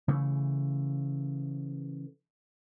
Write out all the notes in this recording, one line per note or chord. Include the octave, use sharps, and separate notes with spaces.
C#3 E3 A3